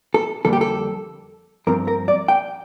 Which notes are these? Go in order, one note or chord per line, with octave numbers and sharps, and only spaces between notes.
A4
F2 D3 G3 A#3 A4
G4
A4
G2 F3 C4 A#4
A#4
D5
G5